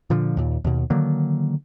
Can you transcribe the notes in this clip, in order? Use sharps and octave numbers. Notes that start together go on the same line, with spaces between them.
A#2 D3 F3
D#2 A#2
D#2 B2
D3 D#3 F#3 A#3